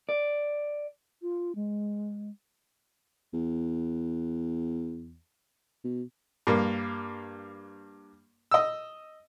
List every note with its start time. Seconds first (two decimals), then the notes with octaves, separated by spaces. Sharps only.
0.09 D5
1.22 F4
1.55 G#3
3.33 E2
5.84 B2
6.47 G2 A#3
8.51 D#5 E6